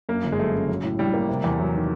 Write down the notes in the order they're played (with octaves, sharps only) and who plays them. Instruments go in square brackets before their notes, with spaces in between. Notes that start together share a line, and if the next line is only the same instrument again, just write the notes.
[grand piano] F#2 [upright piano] A#3
[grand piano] G1
[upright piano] G#3
[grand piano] F#3 [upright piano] A3
[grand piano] C#3
F#3
A2
[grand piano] A2 [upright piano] G3
[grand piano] A#3
C3
E2
F#3
D#3